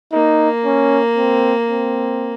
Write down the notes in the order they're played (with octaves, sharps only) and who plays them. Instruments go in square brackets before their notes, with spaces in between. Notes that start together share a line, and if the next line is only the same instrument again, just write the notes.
[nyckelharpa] A#3 [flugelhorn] D#4
[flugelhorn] C#4
C4
C4